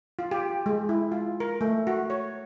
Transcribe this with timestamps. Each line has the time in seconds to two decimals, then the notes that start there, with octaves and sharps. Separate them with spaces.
0.19 F4
0.31 G4
0.66 G#3
0.89 E4
1.12 F4
1.40 A#4
1.61 A3
1.87 F#4
2.10 C#5